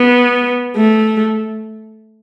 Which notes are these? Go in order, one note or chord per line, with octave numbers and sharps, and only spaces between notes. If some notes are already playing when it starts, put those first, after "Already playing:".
Already playing: B3
A3